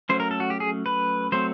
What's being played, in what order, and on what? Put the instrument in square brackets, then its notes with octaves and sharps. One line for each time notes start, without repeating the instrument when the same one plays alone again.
[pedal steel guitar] F#3 A3 C#4 C5
A#4
A4
F#4
G4
G#4
B4
F#3 A3 C4 C5